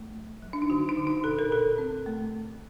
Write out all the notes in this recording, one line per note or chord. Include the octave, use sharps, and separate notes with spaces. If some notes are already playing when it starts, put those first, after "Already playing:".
Already playing: A3
F#3
F#3
D4
D#4
D3 F#4
D#4
D3
D#4
A#2 A4
A#4
A#2 A4
C4
A3